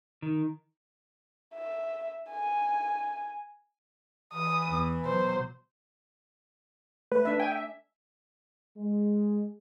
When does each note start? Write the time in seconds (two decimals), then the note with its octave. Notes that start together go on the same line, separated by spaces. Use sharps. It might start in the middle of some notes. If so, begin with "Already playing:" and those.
0.22 D#3
1.55 E5
2.30 G#5
4.33 E3 D#6
4.68 E2
5.05 B2 F#3 C5
7.12 A3 B4
7.25 D4 E5
7.40 G5 G#5
7.52 E5
8.77 G#3